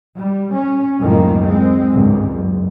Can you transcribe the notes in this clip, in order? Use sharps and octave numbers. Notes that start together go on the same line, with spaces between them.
G3
C#4
C#2 F#2 A2 D#3 F3 A#3
G#3 C4
G#1 C#2 G2
F#1